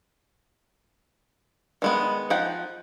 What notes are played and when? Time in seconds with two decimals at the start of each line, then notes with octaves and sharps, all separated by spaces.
1.82 D#3 G#3 B3
2.30 F3 D#4 F#5 G5